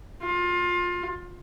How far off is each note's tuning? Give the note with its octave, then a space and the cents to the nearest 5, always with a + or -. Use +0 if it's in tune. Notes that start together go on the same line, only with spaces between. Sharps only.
F4 +25